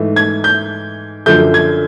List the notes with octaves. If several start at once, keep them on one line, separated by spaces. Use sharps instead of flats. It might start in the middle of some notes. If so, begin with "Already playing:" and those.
Already playing: G#2 E3 A3
G#6
G6
F#2 D3 F3 G6
G#6